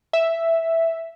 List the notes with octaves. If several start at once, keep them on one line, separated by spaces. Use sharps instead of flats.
E5